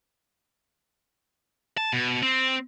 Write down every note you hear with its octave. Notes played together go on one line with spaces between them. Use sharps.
A5
B2
C4